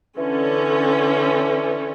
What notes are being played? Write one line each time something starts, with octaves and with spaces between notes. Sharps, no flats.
D3 E3 C#4